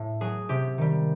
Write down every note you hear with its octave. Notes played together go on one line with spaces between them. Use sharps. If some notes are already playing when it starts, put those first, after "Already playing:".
Already playing: A2
F#3 G#4
C3 G4
D#3 G3